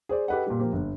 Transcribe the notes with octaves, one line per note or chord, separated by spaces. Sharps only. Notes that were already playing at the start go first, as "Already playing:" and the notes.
G#4 C5 D5
G4 A4 B4 D#5 F#5
A#2 G3
F3 A#3 G4
G1